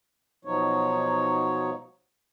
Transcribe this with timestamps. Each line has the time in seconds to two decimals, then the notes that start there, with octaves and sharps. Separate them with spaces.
0.45 B2 F3 F#3 D#4 C#5